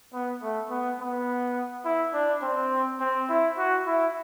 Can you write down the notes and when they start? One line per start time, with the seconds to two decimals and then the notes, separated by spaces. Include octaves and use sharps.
0.13 B3
0.42 A3
0.70 B3
1.00 B3
1.85 E4
2.14 D4
2.42 C4
3.00 C4
3.29 E4
3.58 F#4
3.86 E4